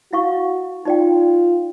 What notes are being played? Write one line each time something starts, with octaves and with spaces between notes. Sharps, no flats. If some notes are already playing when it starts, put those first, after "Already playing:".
E4 F#4 F5 C#6
D#4 F4 D5 G5